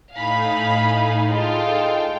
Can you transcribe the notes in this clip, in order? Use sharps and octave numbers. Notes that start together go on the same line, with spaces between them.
A2 D#4 F5 G#5 B5
G#3 F4 A4 G5